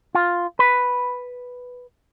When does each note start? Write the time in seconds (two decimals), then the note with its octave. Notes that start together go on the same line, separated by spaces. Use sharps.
0.15 F4
0.59 B4